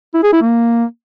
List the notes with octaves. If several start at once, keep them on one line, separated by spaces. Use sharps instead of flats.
E4
G#4
E4
A#3